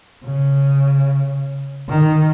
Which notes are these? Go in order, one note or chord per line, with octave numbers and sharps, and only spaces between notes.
C#3
D#3